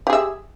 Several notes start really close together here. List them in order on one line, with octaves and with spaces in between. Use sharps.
G4 G#4 E5